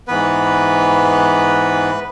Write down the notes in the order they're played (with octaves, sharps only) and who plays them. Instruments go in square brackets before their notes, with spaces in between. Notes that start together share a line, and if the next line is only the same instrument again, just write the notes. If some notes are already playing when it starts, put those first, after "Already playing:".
[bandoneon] G#2 E3 B3 B4